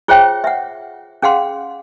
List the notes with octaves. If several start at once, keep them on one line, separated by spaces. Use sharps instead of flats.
F4 G#4 C5 C#5 E5 G5
E5 F#5
C#4 G#4 F5 F#5 C6